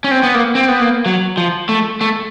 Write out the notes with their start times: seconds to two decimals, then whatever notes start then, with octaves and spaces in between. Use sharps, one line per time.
0.04 C#4
0.11 C4
0.23 B3
0.35 A#3
0.55 C4
0.68 B3
0.81 A#3
1.06 F#3
1.37 F3
1.69 A3
2.01 A3